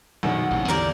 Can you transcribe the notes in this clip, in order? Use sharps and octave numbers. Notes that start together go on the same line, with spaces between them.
A#1 F#2 B2 D#3 E3 F#5
A1 G#2 C3
E2 D3 A#3 G4 A#4 D5